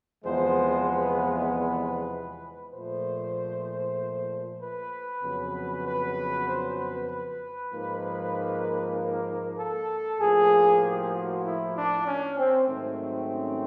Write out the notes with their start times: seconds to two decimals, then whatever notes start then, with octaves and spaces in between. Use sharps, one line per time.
0.24 E2 C3 F3 G#3 B3 C5
0.87 B4
1.17 B4
2.73 A#2 F3 A3 C5
4.60 B4
5.22 F2 C#3 F#3 B3
5.84 B4
6.46 C5
6.77 B4
7.08 B4
7.71 G#2 F3 A#3
8.95 A#4
9.57 A4
10.19 A2 F3 A#3 G#4
10.82 G4
11.13 F#4
11.44 E4
11.75 D4
12.06 C#4
12.38 C4
12.68 G#2 D#3 F#3 A3 C4
13.31 C#4